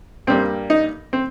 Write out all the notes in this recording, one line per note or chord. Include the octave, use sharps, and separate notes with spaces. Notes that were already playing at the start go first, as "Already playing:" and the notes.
G2 G3 A#3 C4
D#4
C4